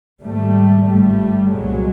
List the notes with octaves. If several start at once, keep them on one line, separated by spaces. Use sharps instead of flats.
G#1 G#2 G3 A3
G1 G2 G3 A3
C2 A#2 F#3 G#3